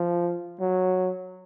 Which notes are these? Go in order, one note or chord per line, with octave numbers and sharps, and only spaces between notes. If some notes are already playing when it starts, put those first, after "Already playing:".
Already playing: F3
F#3